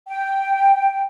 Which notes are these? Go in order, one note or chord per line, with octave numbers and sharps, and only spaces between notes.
G5